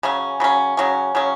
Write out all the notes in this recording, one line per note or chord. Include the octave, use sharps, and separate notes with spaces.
C#3 F#3 C#4
C#3 F#3 C#4
C#3 F#3 C#4
C#3 F#3 C#4